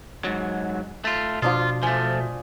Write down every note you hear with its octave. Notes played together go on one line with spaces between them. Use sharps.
G#2 F#3
A3 F4
B2 F3 D4 F4 D#6
F3 A3 G#5